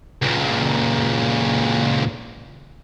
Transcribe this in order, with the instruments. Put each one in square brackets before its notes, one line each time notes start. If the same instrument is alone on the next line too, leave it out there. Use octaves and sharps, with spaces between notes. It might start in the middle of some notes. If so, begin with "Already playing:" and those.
[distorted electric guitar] C#2 A#2